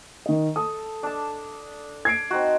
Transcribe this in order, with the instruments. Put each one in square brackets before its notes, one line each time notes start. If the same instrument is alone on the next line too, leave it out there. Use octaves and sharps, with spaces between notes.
[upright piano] D#3 D#5
[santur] A4 [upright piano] D#6
[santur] D4 A5
[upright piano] G#6 C7 D7
[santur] C4 D#4 F#4